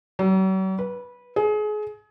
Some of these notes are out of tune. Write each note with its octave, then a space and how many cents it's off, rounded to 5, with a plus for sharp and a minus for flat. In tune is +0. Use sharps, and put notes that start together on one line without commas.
F#3 +45
B4 -15
G#4 +30